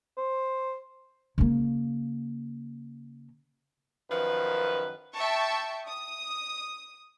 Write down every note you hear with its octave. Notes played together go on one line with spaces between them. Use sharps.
C5
C#3 A#3
F#2 D#3 F3 B4
E5 G5 A5 C#6
D#6